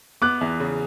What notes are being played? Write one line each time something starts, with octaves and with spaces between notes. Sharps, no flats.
B3 D6 F#6
E2
C#3